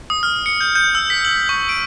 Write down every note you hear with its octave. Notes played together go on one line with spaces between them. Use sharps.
D#6
F6
C#7
G6
G6
E6
B6
F#7
C#6
D7